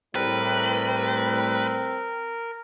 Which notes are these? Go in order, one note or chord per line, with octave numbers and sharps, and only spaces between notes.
A2 G3 C4 A#4 B4